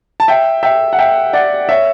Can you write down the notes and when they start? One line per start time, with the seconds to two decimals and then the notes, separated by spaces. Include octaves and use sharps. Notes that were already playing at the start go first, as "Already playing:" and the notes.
0.20 A5
0.28 E5 G5
0.63 E5 G5
0.93 F#5
0.99 E5 G5
1.33 D5 F#5
1.69 C#5 E5